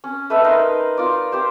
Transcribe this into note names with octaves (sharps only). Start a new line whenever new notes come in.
C#4
A3 B4 D#5 E5
D#4 A#4 B4 C6
F4 D5
G4 C5